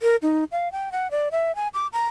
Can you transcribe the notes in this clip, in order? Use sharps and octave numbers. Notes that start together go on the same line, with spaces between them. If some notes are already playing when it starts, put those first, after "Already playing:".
A#4
D#4
F5
G5
F#5
D5
E5
G#5
D6
A#5